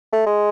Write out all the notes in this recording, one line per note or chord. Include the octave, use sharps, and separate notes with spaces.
A3
G#3